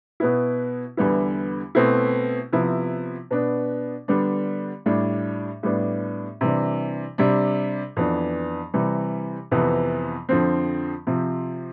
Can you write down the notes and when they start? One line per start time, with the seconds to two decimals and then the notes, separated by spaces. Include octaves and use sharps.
0.20 B2 B3 E4
0.97 E2 D3 G3 B3 E4
1.75 B2 A3 C4 E4
2.53 C3 F3 B3 E4
3.31 B2 B3 D4
4.08 D3 G3 B3 D4
4.86 A2 G3 D4
5.63 A2 G3 B3 D4
6.41 C3 E3 G3 D4
7.18 C3 G3 D4
7.96 F2 E3 B3 D4
8.74 C3 E3 G3
9.51 F2 C3 E3 B3
10.29 F2 D3 F3 C4
11.07 C3 F3 C4